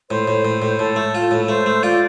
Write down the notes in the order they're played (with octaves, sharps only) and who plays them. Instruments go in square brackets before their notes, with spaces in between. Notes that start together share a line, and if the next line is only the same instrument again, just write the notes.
[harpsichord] A2 [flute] C5
[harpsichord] A2
A2
A2
[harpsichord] A2 [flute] A4
[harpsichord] A3
F4
A2
[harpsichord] A3 [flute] C5
[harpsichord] A3
[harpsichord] F4 [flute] D5